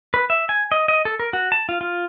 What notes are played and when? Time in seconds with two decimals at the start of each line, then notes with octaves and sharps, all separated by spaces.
0.14 B4
0.30 E5
0.49 G#5
0.72 D#5
0.88 D#5
1.05 A4
1.20 A#4
1.33 F#4
1.52 A5
1.69 F4
1.81 F4